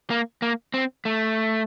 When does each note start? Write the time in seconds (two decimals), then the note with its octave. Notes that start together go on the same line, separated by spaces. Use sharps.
0.10 A#3
0.42 A#3
0.74 C4
1.05 A3